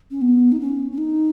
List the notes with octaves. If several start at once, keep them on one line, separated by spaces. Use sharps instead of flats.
C#4
B3
D#4
C#4
C#4
D#4